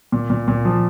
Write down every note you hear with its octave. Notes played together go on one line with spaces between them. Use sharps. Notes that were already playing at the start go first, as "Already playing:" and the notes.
A#2
A#2
A#2
F3